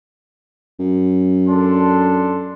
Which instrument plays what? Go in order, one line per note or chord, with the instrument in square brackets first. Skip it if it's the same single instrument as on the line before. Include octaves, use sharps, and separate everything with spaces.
[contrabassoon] F#2
[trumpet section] D4 A4 C6